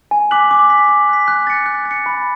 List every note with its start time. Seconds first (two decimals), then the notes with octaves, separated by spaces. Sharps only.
0.11 G#5
0.31 D6 F#6 B6 F#7
0.51 D6
0.70 F#6 B6
0.89 D6
1.09 F#6 B6
1.28 F#6
1.47 A6 C#7
1.66 F#6
1.85 A6
1.91 C#7
2.06 B5